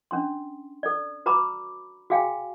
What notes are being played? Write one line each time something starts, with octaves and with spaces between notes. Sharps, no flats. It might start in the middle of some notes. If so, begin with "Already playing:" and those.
C#4 D4 C6
A4 D5
F#4 B4 A#5 B5 D6
F#4 G#4 F5 G5 G#5